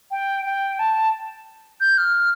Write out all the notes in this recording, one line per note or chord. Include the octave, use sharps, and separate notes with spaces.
G5
G5
A5
G6
F6